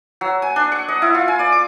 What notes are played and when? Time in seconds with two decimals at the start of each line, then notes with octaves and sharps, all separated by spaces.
0.21 F#3
0.42 G#5
0.56 D4
0.72 F#5
0.88 D#5
1.02 E4
1.15 F4
1.28 G#5
1.39 D5
1.52 D6